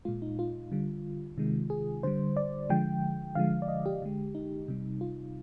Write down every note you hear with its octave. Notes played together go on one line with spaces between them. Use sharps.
A#2 G#3 F4
D#4
F4
D3 G3
C3 D#3 G#3
G#4
D3 G3 C5
D5
D3 F3 G#3 G5
D3 F3 G#3 F5
D5
D#5
G4
D3 G#3
D#4
C3 G3
F4